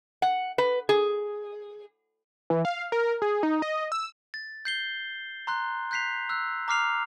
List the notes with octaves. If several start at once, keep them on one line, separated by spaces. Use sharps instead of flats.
F#5
B4
G#4
E3
F5
A#4
G#4
D#4
D#5
E6
A6
G6 C7 G7
A#5 C6 F#6
F#6 G6 B6 C7 F7
E6 F#6
A#5 D6 F6 C7 F7